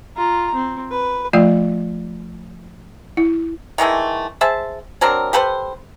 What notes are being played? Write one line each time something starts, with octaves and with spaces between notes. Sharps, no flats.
F4 A#5
C4
B4
F3 A3 F4 D5 F5
E4
D#3 E3 G#3 A3
G#4 C5 E5 A5
F#3 C4 D4 A#4
G4 A4 B4 C5